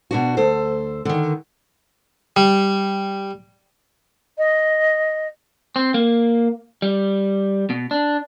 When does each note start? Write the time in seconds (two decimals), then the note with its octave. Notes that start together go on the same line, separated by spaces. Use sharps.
0.11 B2 D4 F#4
0.37 D2 A4 C5
1.05 D3 D#3
2.36 G3
4.38 D#5
5.76 C4
5.94 A#3
6.82 G3
7.70 B2
7.91 D4